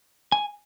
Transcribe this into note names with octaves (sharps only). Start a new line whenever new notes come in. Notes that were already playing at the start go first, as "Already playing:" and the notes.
G#5